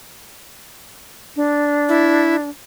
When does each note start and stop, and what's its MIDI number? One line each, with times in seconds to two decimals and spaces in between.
1.36 2.49 62
1.89 2.36 64